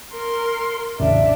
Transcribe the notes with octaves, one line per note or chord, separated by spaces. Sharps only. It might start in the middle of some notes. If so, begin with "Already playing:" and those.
A#4 C6
A1 E2 C#3 D4 E5